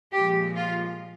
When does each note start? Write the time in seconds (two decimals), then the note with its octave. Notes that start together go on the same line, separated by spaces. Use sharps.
0.13 A#2 F3 G#3 G4
0.56 F4